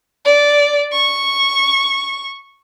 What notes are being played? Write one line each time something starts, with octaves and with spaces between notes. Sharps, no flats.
D5
C#6